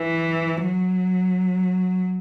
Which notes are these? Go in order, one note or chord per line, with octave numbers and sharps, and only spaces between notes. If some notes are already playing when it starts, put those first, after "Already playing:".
Already playing: E3
F#3